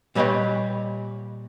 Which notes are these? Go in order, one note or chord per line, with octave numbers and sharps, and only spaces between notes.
A#2 G3 B4 C#5 D#5 G5